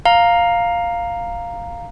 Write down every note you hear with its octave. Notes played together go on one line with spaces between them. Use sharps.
F5 A#5